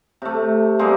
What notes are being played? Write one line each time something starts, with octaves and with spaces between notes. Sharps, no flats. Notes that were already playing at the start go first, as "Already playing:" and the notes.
C3 A3
G3 G#3 A#3 C4